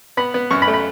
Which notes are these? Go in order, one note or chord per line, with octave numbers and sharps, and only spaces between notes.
B3 B5
B3
F#2 C#6
B5
A3
B5